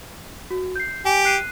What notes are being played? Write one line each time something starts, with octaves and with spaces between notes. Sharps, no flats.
F#4
G6 C7
G4 G#5
F#6 C7 D#7